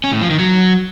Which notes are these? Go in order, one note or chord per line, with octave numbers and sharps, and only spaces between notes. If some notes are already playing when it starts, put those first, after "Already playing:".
C#4
A2
F3
D#3
F#3